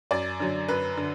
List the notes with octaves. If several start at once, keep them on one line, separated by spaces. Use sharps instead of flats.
F#2 D5
D3 F#3
F#2 B4
D3